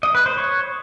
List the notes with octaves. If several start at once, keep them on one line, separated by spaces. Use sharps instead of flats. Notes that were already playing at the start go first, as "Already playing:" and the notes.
D#5
B4
C5
C#5